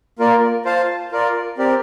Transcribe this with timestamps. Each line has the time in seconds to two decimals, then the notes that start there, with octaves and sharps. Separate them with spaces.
0.19 A#3 F4 A#4 D5
0.65 F4 C5 F5 A5
1.12 F4 A#4 D5
1.58 C4 G4 A#4 D5